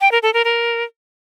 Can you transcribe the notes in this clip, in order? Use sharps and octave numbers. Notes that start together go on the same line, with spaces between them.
G5
A#4
A4
A#4
A#4